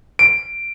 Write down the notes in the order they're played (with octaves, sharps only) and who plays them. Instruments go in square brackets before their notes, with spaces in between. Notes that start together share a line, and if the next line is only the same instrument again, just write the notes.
[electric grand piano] D7